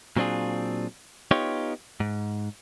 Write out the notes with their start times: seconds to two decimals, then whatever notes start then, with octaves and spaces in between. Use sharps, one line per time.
0.16 A#2 F#3 C4 D4 F4 G#4
1.31 B3 D#4 F4 G4 C#5
2.00 G#2